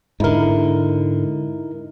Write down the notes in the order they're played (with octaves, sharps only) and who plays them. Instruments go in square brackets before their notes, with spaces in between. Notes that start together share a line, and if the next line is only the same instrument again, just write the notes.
[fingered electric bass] G#2 D3 [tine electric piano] D#4 E4 A#4